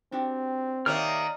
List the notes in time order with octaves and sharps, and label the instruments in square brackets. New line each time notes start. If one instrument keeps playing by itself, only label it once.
[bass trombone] C4 [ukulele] D4 F#4 G4
[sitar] D#3 A#3 [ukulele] G4 C#5 E5 [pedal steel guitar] D5 A#5 F6